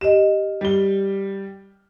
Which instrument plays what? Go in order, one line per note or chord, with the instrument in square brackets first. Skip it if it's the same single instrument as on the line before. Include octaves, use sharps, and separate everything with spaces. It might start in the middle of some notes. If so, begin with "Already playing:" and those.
[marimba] G4 D#5 [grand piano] E7
[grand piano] G3 G7